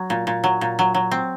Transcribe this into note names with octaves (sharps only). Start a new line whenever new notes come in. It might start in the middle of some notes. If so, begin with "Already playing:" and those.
Already playing: F#3
A#2
A#2
F#3
A#2
F#3
F#3
C4